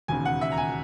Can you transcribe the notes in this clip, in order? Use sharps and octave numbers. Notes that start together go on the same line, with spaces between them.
E1 D#2 C#3 G#5
F#5
E5
A#5
G#5